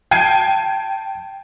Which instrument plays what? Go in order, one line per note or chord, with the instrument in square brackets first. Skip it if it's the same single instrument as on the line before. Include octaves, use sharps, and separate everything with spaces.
[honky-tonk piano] G5 A5 G#6 C7 D#7